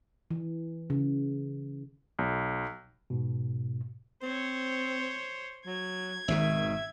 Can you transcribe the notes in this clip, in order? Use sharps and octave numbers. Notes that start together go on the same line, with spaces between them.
E3
C#3
B1
G#2 B2
C4 C5 C#5
F#3 G#6
G#1 B2 D#3 E5